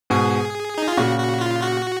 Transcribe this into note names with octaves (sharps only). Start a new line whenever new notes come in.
G#2 B2 G#4
D#4
F4
A#2 C#3 F#4
F#4
F4
F#4